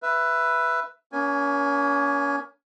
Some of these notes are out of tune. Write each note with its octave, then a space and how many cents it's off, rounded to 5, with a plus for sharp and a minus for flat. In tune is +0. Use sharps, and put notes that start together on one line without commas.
B4 +0 E5 +15
A#3 +30 C#4 +30 G#5 +0